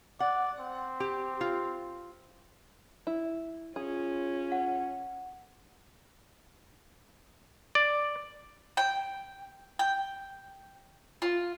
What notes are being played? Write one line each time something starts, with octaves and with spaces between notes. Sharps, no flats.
D5 F#5
C4
G4
F4
E4
C#4 F4 G#4
F#5
D5
G5
G5
F4